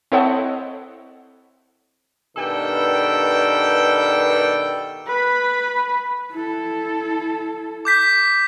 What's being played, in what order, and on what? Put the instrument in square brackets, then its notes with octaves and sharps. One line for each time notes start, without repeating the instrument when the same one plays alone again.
[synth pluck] C4 E4 A4 C#5 D#5 F#5
[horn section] G2 B2 D#3 A4 D5 G5
[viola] B4 B5
[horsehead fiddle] E4 A4
[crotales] D6 G6 B6